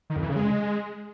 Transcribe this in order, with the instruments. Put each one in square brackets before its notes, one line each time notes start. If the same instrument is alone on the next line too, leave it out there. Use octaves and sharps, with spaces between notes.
[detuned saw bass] D#3
F2
E3
C#3
G#3